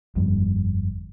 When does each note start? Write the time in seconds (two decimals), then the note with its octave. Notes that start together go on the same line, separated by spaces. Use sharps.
0.16 G1 F2 G3